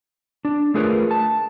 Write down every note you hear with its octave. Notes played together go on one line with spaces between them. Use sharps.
D4
A3 F4 G#4 A#4 B4 C#5
A5